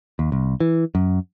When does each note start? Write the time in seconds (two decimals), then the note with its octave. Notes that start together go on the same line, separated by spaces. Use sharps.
0.19 D#2
0.32 C2
0.60 E3
0.95 F#2